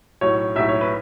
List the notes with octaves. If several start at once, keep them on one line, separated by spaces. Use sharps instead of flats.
B1 A2 F#3 C#5
B1 A2 F#3 E5
C#5
B4